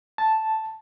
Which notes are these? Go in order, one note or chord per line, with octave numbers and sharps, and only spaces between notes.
A5